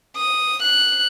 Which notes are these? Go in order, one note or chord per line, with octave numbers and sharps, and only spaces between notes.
D#6
F#6